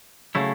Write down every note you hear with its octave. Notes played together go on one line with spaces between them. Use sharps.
C#3 F#3 A3 E4